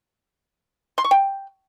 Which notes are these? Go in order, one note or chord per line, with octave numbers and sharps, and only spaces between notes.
C6
C#6
G5